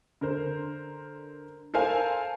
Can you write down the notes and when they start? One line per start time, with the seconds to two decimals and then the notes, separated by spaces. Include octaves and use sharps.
0.21 D3 A#4 C5
1.74 A4 A#4 C5 F5 G#5